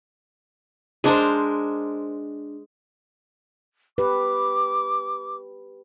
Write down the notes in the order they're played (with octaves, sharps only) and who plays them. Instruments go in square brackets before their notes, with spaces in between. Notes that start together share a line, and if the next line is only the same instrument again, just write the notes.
[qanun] G#3 D4 A#4 C5
[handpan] G4 B4 [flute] D6